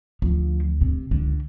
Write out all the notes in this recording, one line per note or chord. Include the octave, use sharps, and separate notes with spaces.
D2 F3
C3
C#2 D3